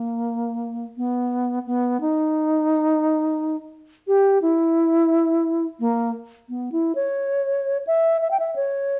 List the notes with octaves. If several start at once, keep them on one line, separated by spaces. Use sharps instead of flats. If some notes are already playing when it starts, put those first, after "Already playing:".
Already playing: A#3
B3
B3
D#4
G4
E4
A#3
B3
E4
C#5
E5
E5
G5
E5
C#5